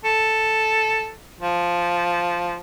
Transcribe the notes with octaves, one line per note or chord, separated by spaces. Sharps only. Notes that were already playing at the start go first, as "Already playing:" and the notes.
A4
F3